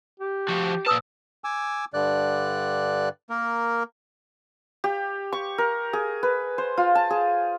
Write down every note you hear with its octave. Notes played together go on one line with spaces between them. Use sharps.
G4
F3 F#4
A#2 B4 A5 D#6 E6
G#5 D6 E6
G2 D3 D5 F#6
A#3 A#4
G4
C#6
A#4
G#4
B4
C5
F4
A5
G#4